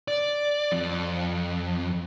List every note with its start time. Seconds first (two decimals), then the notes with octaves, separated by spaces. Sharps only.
0.08 D5
0.72 F2